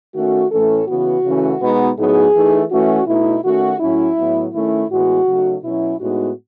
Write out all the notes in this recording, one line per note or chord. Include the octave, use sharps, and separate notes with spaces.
D#3 A3 C#4 F#4
A2 E3 A3 C#4 A4
C#3 E3 B3 F#4
C#3 E3 A3 C#4
B2 G#3 B3 D#4
A2 F#3 B3 D#4 G#4
E3 A3 D#4
E3 A3 C#4 F#4
B2 A3 D#4 E4
D#3 A3 C#4 F#4
A2 F#3 C#4 E4
A2 F#3 B3
D#3 A3 C#4 E4
A2 E3 G#3 B3 F#4
C#3 F#3 A3 D#4
B2 F#3 C#4 E4
A2 G#3 B3 D#4 F#4